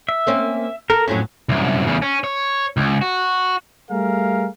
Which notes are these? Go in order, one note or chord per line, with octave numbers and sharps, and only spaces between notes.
E5
A#3 C4 C#4
A4 A#4
F2 A2 F#3 C#4
C2 F#2
E2 C#3
C#4
C#5
C#2
F#4
G3 A3 G#4 A#4 F5